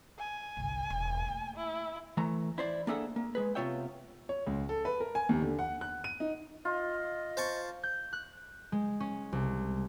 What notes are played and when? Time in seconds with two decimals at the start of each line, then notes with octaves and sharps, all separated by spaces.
0.19 G#5
0.57 G1 C2
0.90 E1
1.26 A3 A#3
1.56 E4
2.17 E3 A3 A#5
2.58 E4 C5 D5
2.87 A#3 D4 G#4 A4 E5 F#5
3.16 A#3
3.35 G#3 G#4 B4
3.55 C3 B3 F4 C#5 E5 G5
4.29 C#5
4.47 C#2
4.69 A4
4.85 B4
5.00 A#4
5.15 G#5
5.29 D#2
5.42 D3
5.59 F#5
5.81 F#6
6.04 D#7
6.20 D#4
6.65 F4 D#5
7.37 C5 A5 C#6
7.83 G6
8.13 F#6
8.72 G#3
9.00 C#4
9.33 C2